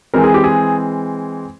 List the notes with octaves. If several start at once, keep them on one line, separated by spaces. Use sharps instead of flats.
E3 G#3 C4 A#4
G#4
G4
G#4